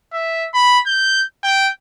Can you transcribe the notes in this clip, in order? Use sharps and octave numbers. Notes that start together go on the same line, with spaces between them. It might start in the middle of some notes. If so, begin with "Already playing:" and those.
E5
B5
G6
G5